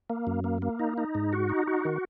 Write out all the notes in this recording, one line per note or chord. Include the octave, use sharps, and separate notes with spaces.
A#3
F#2
A#3
A#3
D#4
D#4
G#2
F#4
D#4
F#4
D#3